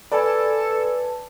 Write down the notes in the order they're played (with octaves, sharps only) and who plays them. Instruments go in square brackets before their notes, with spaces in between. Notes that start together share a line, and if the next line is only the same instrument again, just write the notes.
[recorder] A4 [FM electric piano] B4 A5 [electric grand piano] D5 G#5